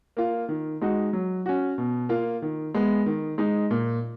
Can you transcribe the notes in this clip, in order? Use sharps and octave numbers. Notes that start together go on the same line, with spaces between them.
A#3 F4
D#3
G#3 D#4 F#4
F#3
C#4 F#4
B2
A#3 F4
D#3
G#3 B3
D#3
G#3 D#4
A#2